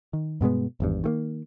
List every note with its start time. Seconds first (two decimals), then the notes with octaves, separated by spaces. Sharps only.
0.13 D#3
0.41 G2 B2 G#3 B3
0.80 G#1 E2 G2
1.04 D#3 A3 A#3